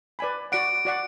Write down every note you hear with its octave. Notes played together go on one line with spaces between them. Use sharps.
B4 D5 G#5 B5
F#4 D5 F#5 D7
F#4 D5 F#5